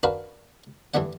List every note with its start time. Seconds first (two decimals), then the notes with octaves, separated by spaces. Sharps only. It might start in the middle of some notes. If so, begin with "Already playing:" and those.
0.03 D4 F#4 A#4 B4 F5 A#5
0.94 G2 E3 G3 A3 D4 F#5